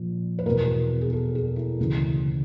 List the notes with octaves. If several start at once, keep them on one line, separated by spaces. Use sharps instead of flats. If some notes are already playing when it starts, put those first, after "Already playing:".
Already playing: A#1 A#2 F3
B4
E2 B2 A#4
G#4
A4
G#4
E4
D2 C#3 E3